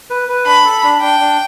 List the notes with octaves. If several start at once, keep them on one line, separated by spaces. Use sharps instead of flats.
B4
B4
D4 B5
A4
D4
D4 G5
D4